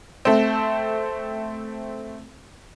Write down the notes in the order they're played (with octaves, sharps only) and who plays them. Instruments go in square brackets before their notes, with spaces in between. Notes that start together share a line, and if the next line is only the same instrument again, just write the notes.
[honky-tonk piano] A3 C4